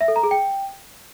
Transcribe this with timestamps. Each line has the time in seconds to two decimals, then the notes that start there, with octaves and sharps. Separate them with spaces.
0.01 E5
0.08 A4
0.16 A#5
0.23 G#4
0.31 G5